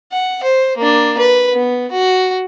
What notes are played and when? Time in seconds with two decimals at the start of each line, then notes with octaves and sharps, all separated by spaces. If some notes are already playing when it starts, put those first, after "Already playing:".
0.12 F#5
0.44 C5
0.77 A#3 D4
1.18 B4
1.54 B3
1.91 F#4